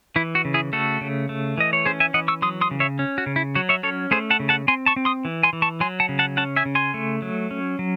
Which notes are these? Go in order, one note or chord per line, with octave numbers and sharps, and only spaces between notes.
E3 E4
F#4
C#3
E4 G#4
A3 F#4 A4
C#3
A3
E3 D#5
C#5
C#4 G#4 C5
E5 G#5
E3 D#5 F#5
C#6 E6
F#3 C6 D#6
C6 D#6
C#3
C#5 E5
C#4
F#4
C#3
E4
F#3 F#4
C#5 E5
C#4 A4 C#5
A3 G#4 C5
F#5 A5
C#3
F#5 A5
C4 G#5 C6
A5 C#6
C4
C6 D#6
E3
G#5 C6
E3
A5 C#6
F#3 G#5 C6
F#5 A5
C#3
F#5 A5
C#4 F#5 A5
E5 G#5
C#3
G#5 C6
A3
F#3
C#4
F#3